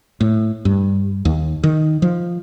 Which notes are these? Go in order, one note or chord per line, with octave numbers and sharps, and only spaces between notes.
A2
G2
D#2
D#3
F3